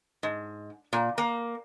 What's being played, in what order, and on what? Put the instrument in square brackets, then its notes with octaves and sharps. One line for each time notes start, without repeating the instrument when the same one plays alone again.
[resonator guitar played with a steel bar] G#2
A#2
A#3